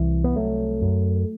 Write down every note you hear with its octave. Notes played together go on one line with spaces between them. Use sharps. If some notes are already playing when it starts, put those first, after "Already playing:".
Already playing: C2 E3
B3
C2 F#3 A3
F#2